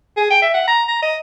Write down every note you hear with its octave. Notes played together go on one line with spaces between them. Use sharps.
G#4
G5
E5
F#5
A#5
A#5
D#5